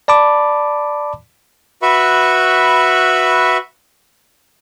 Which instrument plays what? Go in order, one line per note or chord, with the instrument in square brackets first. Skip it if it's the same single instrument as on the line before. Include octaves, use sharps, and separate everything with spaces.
[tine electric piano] D5 A5 B5 D6
[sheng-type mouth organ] F#4 B4 E5 B5 C#6